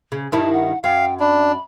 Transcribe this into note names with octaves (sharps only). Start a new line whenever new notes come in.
C#3
G2 D#3 E4 A5
F#5
F#2 F5 G5
D4 B5